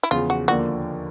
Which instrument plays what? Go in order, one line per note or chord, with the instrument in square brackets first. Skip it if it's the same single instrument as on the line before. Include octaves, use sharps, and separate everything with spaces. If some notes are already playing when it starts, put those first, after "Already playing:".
[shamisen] E4
[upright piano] E2 C#3 F3 [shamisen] F4
[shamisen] F#4
[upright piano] D#2 D3 F3 A#3 [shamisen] F#4